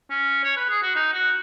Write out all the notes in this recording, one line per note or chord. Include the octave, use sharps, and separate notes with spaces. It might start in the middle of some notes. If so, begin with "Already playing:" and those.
C#4
C#5
B4
G#4
F#4
D#4
F#4